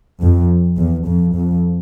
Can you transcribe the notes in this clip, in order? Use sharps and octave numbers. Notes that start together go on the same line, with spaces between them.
F2
E2
F2
F2